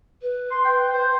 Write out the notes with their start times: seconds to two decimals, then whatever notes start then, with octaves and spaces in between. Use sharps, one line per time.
0.22 B4
0.51 C6
0.65 G5
0.92 C5